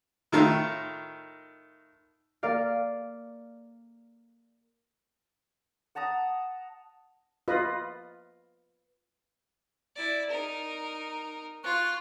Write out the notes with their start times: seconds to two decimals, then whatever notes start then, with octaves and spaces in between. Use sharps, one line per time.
0.32 A2 D#3 F4
2.43 A#3 A#4 D5 F5
5.95 F#5 A5 A#5 D#6
7.48 F4 B4 D#5
9.95 E4 D5
10.29 D#4 A#4
11.64 F4 C6 C#6 F#6